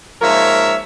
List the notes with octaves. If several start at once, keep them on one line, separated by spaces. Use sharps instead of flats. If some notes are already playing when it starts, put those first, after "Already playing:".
G#2 F3 A#3 A#4 C#5 E5